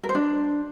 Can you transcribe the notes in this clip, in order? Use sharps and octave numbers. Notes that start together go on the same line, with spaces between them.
A#4
C5
D4